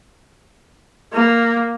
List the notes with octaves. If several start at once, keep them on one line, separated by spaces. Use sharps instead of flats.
A#3